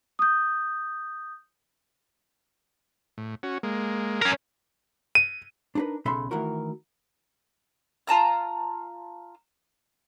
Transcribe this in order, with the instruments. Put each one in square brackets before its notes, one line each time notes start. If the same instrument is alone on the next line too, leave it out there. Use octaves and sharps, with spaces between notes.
[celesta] D#6 G6
[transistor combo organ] A2
C#4 F#4
G#3 A#3
[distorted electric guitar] C#4 A#4
[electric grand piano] D#7
[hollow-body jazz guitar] D4 D#4 G#4 A#4 B4
B1 C#3 A4 E5 B5 C6
D#3 E3 A3 E4 F#4 A#4
[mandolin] F4 A5 A#5 F6